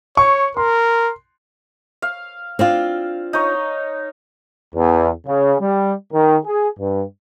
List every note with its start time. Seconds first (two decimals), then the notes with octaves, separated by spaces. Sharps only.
0.17 C#5 C#6
0.57 A#4 C6
2.02 F5
2.59 C4 D4 F4
3.33 D#4 C#5
4.75 E2
5.26 C#3
5.60 G3
6.13 D#3
6.45 G#4
6.78 G2